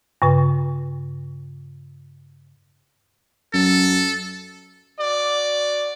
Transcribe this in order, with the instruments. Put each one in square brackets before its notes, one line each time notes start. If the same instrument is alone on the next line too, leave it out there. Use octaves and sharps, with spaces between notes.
[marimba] G2 C#3 B4
[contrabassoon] F#2 [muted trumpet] A4
[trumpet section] F#4 D5